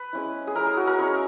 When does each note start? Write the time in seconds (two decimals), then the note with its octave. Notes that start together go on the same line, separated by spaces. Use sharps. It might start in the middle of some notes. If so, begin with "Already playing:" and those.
Already playing: B4
0.13 G#3 C#4 E4
0.47 G#4
0.55 G#3 C#4 E4 A#4
0.67 G#4
0.77 F#4
0.87 A#4
0.98 G#3 C#4 E4 C#5